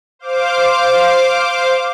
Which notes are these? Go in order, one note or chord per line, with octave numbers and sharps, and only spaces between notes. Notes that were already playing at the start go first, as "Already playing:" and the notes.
C5 F5 D6